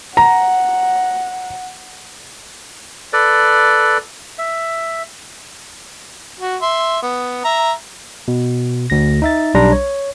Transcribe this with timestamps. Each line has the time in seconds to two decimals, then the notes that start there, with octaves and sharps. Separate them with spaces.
0.17 F#5 A#5
3.13 A4 B4 D5
4.38 E5
6.41 F#4
6.62 E5 C6
7.03 B3
7.45 E5 A#5
8.28 B2
8.90 D2 A#6
9.22 D#4 E5 A6
9.54 B1 G3 D4 A#5 C6 A#6
9.72 C#5